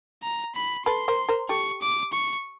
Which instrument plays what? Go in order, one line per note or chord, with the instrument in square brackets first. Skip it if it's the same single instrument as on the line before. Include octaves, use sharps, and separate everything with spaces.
[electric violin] A#5
B5
[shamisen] A4 B4 [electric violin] C6
[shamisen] A#4 C5
A#4 C5
[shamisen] G4 A4 [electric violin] C#6
[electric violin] D6
C#6